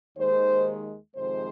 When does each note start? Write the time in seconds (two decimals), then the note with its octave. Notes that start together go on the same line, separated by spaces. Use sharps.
0.17 D#2 D#3 G#3 C5
1.16 F2 C3 D#3 G#3 C5